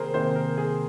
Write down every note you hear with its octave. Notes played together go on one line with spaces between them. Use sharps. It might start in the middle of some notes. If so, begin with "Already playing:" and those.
Already playing: C3 D#3 A#3 G#4 A#4 C5
C3 D#3 A#3 C5
A#4
G#4